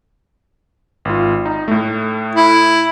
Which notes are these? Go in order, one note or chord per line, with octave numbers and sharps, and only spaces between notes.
G#1 F4
D#4
A2 A3
E4